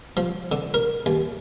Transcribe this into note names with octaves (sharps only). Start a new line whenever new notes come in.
F3
D3
A#4
D#2